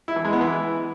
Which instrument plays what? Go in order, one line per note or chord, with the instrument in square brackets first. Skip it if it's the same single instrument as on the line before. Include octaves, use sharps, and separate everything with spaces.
[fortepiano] E4
E3
G#3
B3
E3